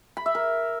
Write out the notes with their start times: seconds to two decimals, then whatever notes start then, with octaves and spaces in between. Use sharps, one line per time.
0.17 B5
0.26 E5
0.35 A#4